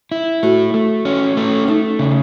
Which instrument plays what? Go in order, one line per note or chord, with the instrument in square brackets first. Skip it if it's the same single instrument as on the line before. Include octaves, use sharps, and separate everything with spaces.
[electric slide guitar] E4
[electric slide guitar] A3 [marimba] F#4
[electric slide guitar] A3
C#4
A3
[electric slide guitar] A3 [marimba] D#4
[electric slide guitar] C#3